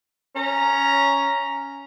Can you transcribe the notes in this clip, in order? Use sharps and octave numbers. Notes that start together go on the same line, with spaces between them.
C#4 A#5